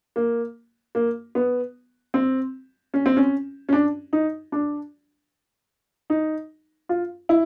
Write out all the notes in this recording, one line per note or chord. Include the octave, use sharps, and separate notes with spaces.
A#3
A#3
B3
C4
C#4
C4
C#4
C#4
D4
D#4
D4
D#4
F4
E4